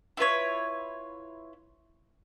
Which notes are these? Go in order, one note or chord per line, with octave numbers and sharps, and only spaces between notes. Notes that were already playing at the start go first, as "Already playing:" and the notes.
E4 F4 B4 C#5